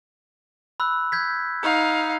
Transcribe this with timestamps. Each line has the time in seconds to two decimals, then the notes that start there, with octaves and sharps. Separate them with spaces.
0.80 B5 E6 F#6
1.12 G6 G#6 B6
1.63 D#4 F5